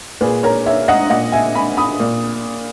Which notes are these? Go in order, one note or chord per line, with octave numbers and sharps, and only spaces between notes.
A#2 G#4 B4
A#4 C#5
C#5 E5
D#5 F#5
A#2 D#5 F#5
E5 G#5
G#5 B5
B5 D#6
A#2